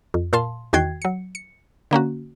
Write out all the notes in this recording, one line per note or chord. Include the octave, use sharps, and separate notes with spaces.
F2
A#2 F5 A5 C6
E2 D#3 F#4 G5 G#6 C7
F#3 C#7
C#7
D3 A#3 C#4 F#4